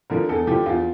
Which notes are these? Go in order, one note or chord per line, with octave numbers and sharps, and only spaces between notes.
D3 F3 A#4
E2 A4
D3 F3 G4
E2 F4